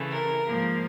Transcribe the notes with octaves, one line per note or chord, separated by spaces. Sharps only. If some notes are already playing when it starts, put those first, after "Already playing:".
Already playing: C#3 E3 A3
A#4
G#2 F3 A#3